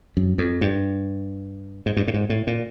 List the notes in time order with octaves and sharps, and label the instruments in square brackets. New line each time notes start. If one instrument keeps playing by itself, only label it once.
[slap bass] F#2
F2
G2
G#2
G2
A2
G#2
A2
A#2